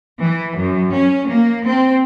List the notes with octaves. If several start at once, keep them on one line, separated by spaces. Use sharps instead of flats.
E3
F#2
C#4
A#3
C4